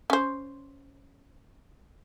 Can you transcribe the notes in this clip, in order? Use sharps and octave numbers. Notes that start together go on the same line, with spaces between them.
C#4 C5